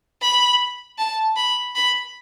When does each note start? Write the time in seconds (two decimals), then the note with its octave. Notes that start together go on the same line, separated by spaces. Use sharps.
0.22 B5
0.99 A5
1.36 B5
1.75 B5